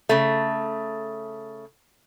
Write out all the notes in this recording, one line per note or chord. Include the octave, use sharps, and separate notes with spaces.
C#3 A3